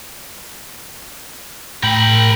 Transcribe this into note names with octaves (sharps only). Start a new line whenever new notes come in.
A2 A#4 G5 B5